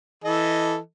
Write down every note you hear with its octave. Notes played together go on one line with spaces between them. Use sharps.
E3 A4 D#5